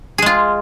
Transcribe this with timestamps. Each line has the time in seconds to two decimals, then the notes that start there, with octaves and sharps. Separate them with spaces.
0.18 G#4
0.22 G#3
0.26 F4